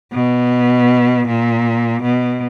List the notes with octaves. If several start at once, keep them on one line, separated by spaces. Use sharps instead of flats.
B2
A#2
B2